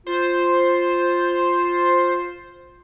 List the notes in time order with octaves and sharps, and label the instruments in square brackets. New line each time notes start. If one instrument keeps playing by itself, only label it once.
[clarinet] F4 [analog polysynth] C5